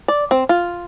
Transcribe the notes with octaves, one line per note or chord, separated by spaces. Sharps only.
D5
C4
F4